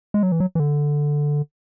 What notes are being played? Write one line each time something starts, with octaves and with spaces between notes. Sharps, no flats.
G#3
F#3
E3
F#3
E3
D3